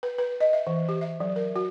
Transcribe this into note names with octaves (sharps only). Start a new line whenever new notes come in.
B4
B4
D#5
E5
E3
G4
E5
F#3
A#4
F#4